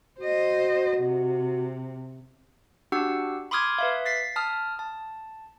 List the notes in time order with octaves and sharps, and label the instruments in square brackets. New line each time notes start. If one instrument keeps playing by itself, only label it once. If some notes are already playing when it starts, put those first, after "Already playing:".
[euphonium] F#4 [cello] C5 D#5
[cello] C3
[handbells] D4 F#4 G4 F#5 E6
B5 C6 D6 D#6 F6 G#6
B4 E5 F5
A6 B6 C7
A5 D#6 F6
A5